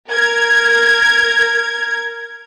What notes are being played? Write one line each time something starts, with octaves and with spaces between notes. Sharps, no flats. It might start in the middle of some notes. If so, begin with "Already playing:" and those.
A#4 G#6